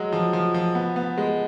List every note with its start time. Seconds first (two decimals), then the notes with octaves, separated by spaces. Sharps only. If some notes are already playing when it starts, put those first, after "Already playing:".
Already playing: F#3 G#3
0.12 F3
0.33 F3
0.54 F3
0.75 B3
0.96 B3
1.18 G#3